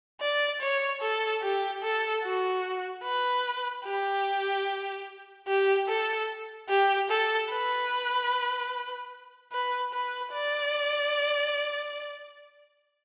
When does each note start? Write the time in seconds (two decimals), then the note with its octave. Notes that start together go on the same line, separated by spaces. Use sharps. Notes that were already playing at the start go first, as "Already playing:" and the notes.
0.20 D5
0.61 C#5
1.01 A4
1.42 G4
1.82 A4
2.24 F#4
3.04 B4
3.85 G4
5.48 G4
5.88 A4
6.69 G4
7.09 A4
7.50 B4
9.52 B4
9.93 B4
10.33 D5